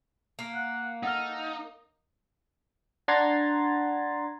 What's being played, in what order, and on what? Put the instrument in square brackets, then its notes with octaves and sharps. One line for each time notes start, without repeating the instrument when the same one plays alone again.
[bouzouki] A#3
[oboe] F#5
[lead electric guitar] D#4 [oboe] A4 [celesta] F#5 F6
[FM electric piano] D4 F#5 A#5 C6 G#6 A6